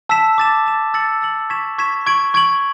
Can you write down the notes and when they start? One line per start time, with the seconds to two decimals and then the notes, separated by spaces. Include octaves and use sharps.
0.09 A5 E6 B6 E7
0.38 D6 A6 E7
0.66 D6 A6 E7
0.94 E6 A6 C#7 F#7
1.22 E6 A6 C#7 F#7
1.50 C#6 G#6 B6 E7
1.78 C#6 G#6 B6 E7
2.06 C#6 G#6 D7 F#7
2.34 C#6 G#6 D7 F#7